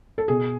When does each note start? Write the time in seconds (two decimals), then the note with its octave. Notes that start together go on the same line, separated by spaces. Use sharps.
0.18 A4
0.28 B2 G#4